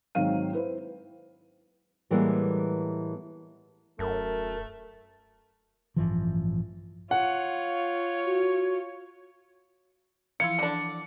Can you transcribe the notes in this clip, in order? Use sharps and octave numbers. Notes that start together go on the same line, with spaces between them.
G#2 D#3 F#3 C4 F5 D#7
E4 B4 C5
A2 E3 G3 G#3 A#3 B3
D#1 F#2 A3 A#4
A1 G2 E3 F3
F4 C#5 F#5
F#4
E3 F3 E4 F4 C#7
D3 D4